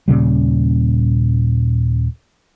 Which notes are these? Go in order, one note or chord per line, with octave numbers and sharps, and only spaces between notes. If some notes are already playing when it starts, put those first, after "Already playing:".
D#1 A#2 C#3 G3